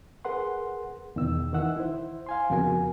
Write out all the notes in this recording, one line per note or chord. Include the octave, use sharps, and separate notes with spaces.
G#4 A#4 B4 F#5 C6
E2 B2 D#3 D#4 E6
D#3 E3 F#5 E6
E4 C5
F5 G#5 C6
F2 C#3 B3 F#4 A#4 G#5